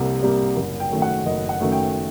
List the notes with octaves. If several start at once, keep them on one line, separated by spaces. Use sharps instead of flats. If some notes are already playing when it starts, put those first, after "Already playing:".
Already playing: C2 C3 G3 A#3
C3 G3 A#3
F#1
G5
F#2 D#3 A3
F#5
F#1 D#5
F#5
F#2 D#3 A3
G5